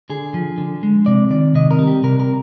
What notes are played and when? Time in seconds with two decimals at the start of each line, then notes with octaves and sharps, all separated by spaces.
0.10 D3 G#4
0.34 F3
0.58 D3
0.83 G#3
1.06 C3 D5
1.30 D#3 D5
1.55 C3 D#5
1.71 A#4
1.79 G3
1.87 G4
2.04 C3 A#4
2.20 A#4